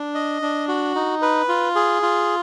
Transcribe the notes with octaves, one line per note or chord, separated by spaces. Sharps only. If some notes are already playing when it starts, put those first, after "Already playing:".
Already playing: D4
D#5
D4
F#4
D#4
B4
F4
G#4
F4